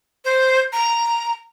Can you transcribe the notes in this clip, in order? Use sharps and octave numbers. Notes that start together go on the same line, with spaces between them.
C5
A#5